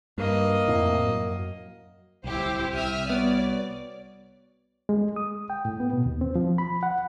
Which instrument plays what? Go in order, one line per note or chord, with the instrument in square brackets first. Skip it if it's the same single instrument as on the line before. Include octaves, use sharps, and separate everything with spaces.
[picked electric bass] G2 [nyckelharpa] A#3 D#5
[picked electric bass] F2 A2 C3
F#2
[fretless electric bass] D1 C2 [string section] E4 G4 C5
[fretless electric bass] C2 [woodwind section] C3 C4 [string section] E5 D#6 F6
[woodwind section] G3 F#4 C#5 [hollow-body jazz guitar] B3 [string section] D5
[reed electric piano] G#3
D#6
G5
A2
B3
B2
D#2
C4
F3
B5
F#5